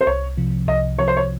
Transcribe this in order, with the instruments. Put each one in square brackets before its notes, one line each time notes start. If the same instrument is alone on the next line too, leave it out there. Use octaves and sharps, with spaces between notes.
[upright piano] C5
[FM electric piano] C2 [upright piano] C#5
[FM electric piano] C3 F3
[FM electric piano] C2 [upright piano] D#5
[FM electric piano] C3 F3 [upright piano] C#5
[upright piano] C5
C#5